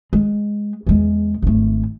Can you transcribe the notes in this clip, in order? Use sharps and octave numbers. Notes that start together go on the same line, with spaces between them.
G#3
E2 G#3
G#1 A3